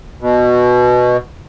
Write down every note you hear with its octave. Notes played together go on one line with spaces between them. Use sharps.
B2